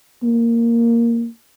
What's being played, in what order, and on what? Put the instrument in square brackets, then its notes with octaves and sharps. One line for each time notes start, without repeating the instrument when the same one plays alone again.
[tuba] A#3